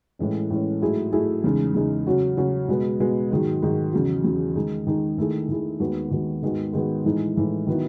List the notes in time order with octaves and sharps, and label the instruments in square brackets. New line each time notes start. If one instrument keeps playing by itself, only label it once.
[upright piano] A2 E3 G#3 C#4
A2 E3 G#3 C#4
G#2 F#3 A3 E4 G#4
G#2 F#3 A3 E4 G#4
E2 C#3 G#3 D#4
E2 C#3 G#3 D#4
C#3 F#3 C#4 F#4
C#3 F#3 C#4 F#4
B2 G#3 B3
B2 G#3 B3
G#2 D#3 F#3
G#2 D#3 F#3
E2 C#3 F#3
E2 C#3 F#3
D#3 G#3 D#4 G#4
D#3 G#3 D#4 G#4
D#3 A3 E4 G#4
D#3 A3 E4 G#4
D#2 D#3 G#3 B3 F#4
D#2 D#3 G#3 B3 F#4
G#2 D#3 G#3 B3 F#4
G#2 D#3 G#3 B3 F#4
A2 E3 G#3 D#4
A2 E3 G#3 D#4
D#3 F#3 B3 E4